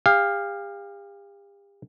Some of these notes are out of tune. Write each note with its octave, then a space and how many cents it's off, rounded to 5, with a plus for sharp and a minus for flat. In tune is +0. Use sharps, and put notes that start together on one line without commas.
G4 +40 F5 +0